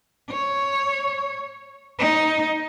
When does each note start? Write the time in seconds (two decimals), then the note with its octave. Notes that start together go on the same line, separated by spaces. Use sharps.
0.30 C#5
1.99 D#4